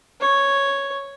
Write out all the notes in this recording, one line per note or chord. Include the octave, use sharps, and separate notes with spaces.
C#5